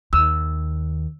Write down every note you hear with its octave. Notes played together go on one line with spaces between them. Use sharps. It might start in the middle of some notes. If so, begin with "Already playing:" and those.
D#2 E6